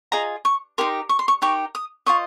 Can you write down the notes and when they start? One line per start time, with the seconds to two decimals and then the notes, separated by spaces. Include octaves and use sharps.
0.12 F4 G#4 D#5 A#5
0.45 C#6
0.78 D#4 G4 A#4 C6
1.09 C#6
1.19 C6
1.28 C#6
1.42 D#4 G4 A#4 C#6
1.75 D#6
2.06 F4 C5 D#5 C#6